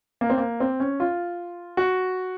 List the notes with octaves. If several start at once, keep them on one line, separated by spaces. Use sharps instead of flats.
A#3
C4
A#3
C4
C#4
F4
F#4